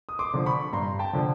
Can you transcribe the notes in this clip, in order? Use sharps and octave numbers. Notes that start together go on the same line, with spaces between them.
D#6
C6 D6
D3 F3
B5 C#6
G2 A#5 C6
G5 A5
D3 F3